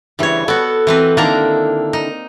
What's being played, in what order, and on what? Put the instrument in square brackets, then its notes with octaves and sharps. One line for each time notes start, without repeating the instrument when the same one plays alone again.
[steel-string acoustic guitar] D2 C#3 E3 [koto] G3 C#5
[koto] B3 F#4 [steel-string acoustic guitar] A4
[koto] E3 C4 B4
[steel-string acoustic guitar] D3 D#3 E4 [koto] A#3 D4 A#5
[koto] D#4